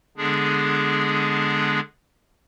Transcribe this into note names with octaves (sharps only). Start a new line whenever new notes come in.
D3 G#3 B3 D4 G#4